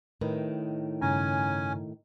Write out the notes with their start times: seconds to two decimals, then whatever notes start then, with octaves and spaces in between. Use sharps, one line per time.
0.21 A2 D#3 A#4 B4 D#5
1.01 G2 C#3 C#4 G#5 A#5